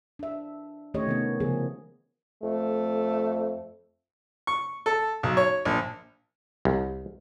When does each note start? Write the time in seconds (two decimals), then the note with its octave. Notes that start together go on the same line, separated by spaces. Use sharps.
0.19 D4 E5
0.94 D#3 A3 C#4 G4 C#5 D#5
1.07 C3 D#3 B3
1.40 C#3 F3 B3 G#4
2.43 F2 A3
4.47 C#6
4.86 A4
5.23 B1
5.37 C#5
5.65 A#1
6.65 C2